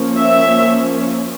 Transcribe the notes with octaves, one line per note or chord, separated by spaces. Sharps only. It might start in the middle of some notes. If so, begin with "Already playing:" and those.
Already playing: F3 A#3 C#4
E5